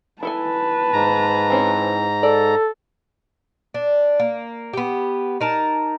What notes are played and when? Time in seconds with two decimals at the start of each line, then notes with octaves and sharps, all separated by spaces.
0.23 E4 A4 B4 G#5 A5
0.93 G#2 A#5
1.50 E3 C4 C#4
2.23 A4 D5
3.74 D4
4.20 A#3
4.73 B3 G4
5.41 D#4 A#4 A5